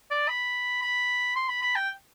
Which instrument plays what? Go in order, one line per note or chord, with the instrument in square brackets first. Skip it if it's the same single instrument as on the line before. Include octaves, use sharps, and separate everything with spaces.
[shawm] D5
B5
B5
C6
B5
B5
G5